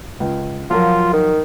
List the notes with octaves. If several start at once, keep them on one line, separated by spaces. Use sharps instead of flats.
C#2
F3 F#3 F4 A#4
D#3